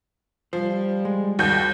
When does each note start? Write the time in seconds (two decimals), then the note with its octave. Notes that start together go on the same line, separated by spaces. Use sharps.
0.53 F3 G3 C5
1.05 G#3
1.39 D#2 F#4 G6